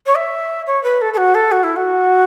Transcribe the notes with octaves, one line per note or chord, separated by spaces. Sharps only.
C#5
E5
C#5
B4
A4
A4
F#4
A4
F#4
E4
F#4